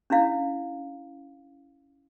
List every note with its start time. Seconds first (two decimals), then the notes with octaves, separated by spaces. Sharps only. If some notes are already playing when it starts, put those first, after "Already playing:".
0.10 C#4 D4 E4 F5